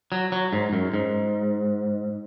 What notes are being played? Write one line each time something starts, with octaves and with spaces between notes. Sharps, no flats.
F#3
F#3
G#2
F#2
G#2